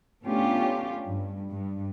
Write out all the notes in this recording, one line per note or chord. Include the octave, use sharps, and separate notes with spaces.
A3 B3 C#4 D4 F4 G4
G2
G2